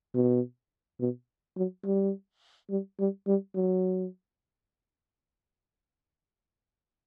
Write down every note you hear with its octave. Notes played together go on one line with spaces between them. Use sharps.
B2
B2
F#3
G3
G3
G3
G3
F#3